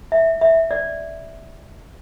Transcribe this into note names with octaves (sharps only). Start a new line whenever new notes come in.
E5
E5
D5